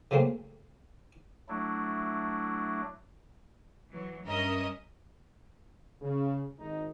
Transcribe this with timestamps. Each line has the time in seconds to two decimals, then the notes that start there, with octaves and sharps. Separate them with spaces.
0.11 C#3 F#3 A3 A#3 C4
1.48 F#3 A3 D4 E4
3.90 E3 F#3
4.25 G2 C#4 A#4 D#5 E5 D#6
6.00 C#3
6.58 G#1 D#4